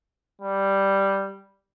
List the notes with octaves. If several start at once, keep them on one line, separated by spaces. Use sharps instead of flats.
G3